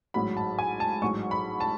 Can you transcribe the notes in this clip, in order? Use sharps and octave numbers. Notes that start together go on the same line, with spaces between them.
A1 G#2 F#3 B5
A5
G#5
A5
A1 G#2 F#3 C#6
B5
A5